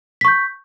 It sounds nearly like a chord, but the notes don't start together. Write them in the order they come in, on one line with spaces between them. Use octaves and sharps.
B6 C#6 G6